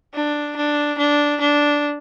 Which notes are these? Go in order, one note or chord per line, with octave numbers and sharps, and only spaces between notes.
D4
D4
D4
D4